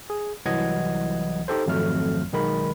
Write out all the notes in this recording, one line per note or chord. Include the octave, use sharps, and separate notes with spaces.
G#4
C2 E3 F#3 D#5 F#5 G#6
D#4 G4 A4 C5
G#1 F2 F#3 A3 F6
B1 D#3 G#3 A#4 B5